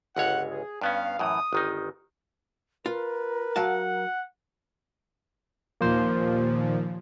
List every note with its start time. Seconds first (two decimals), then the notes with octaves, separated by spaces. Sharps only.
0.16 G1 C#2 C#5 F#5
0.51 G#4
0.81 G2 B3 C#4 F5
1.19 F#2 A2 E3 D#6
1.53 G1 D#3 D#4
2.86 F4 A#4 B4
3.56 F#3 F5 F#5 A5
5.81 D#2 A#2 F3 A#3 C5